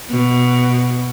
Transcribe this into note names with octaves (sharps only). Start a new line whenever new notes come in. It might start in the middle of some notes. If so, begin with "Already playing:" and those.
B2